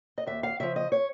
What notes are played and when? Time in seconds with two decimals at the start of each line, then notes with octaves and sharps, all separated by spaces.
0.18 D#5
0.27 D#2 E5
0.43 F5
0.60 C#3 F3 E5
0.76 D#5
0.92 C#5